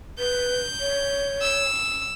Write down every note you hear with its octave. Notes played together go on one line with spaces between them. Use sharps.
B4 G6
C#5
E6